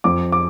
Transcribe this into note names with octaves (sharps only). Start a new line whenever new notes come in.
F2 D6
D6